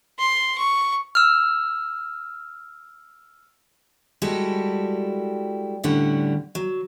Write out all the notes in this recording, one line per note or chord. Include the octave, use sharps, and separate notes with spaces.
C6
C#6
E6 F6
G3 G#3 E4 F#4 G4 A4
D2 A2 D3 G3 C#4 F#5
F#3